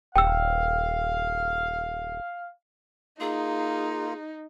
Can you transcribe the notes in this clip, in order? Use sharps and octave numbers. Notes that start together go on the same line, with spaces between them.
D#1 F5 G5 E6
A#3 D#4 F4 G#4